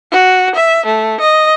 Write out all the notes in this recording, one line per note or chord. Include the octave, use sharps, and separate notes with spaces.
F#4
E5
A3
D#5